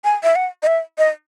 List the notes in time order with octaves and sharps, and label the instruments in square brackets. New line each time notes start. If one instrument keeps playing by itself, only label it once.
[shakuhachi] G#5
E5
F#5
D#5
E5
D#5